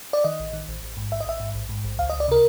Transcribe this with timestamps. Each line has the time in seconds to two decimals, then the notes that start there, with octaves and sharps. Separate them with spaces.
0.13 D5
0.24 D#3 D#5
0.40 A1
0.53 D#3
0.68 A1
0.83 A1
0.97 G#2
1.12 A1 E5
1.20 D#5
1.26 A1 E5
1.40 G#2
1.55 A1
1.69 G#2
1.85 A1
1.99 C#2 F5
2.10 D#5
2.13 C#2
2.20 D5
2.28 C3 A#4